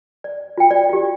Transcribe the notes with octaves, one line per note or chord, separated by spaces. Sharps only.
D5
F4 G5
D5
F4 G4